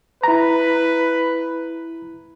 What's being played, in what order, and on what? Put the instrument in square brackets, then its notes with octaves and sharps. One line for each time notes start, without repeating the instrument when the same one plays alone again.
[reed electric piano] E4 A#5 [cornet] B4